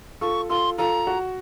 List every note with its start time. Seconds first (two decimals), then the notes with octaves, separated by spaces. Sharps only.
0.21 F4 A4 C#6
0.50 F4 A4 C6
0.78 F4 A4 A#5
1.07 F#4